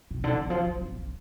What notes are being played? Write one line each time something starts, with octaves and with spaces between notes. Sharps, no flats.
B2
D3
D#3
F3
F#3
F3
D#3